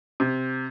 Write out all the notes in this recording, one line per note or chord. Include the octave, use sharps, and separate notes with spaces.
C3